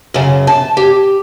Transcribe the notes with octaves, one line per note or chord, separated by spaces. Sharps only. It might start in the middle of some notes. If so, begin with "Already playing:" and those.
F#2 C#3
A5
G4